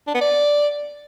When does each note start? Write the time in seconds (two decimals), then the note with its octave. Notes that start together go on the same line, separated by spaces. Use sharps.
0.07 D4
0.14 B3
0.21 D5